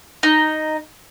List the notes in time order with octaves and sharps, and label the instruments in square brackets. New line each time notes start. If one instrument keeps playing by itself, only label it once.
[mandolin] D#4